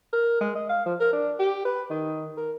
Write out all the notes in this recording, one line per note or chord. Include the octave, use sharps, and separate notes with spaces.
A#4
G#3
D#5
F5
F3
A#4
D4
G4
B4
D#3
A#4